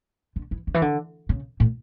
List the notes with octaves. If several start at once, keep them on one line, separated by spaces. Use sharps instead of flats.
D3
E3
D3
E3
D3
C#3
A2